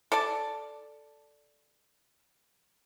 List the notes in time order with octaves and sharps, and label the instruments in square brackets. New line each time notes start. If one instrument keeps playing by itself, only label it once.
[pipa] A4 D5 A5